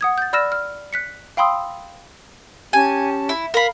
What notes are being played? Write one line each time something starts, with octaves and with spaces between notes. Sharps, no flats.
F#5 D#6 G#6
G6 A6
D5 B5 E6 F6 A#6 E7
F6
F#6 B6 C#7
F5 G5 B5 C6 D#6 E6
C#4 G4 G#5 A5
E4
A#4 F5 B5